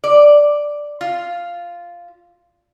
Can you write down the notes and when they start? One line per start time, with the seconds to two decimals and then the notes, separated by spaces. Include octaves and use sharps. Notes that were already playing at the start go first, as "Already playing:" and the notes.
0.04 D5
1.01 F4